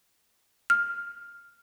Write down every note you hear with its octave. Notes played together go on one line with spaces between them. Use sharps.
F6